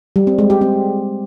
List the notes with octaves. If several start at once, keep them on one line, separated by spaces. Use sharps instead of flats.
G3
C4
G#3
G4
C4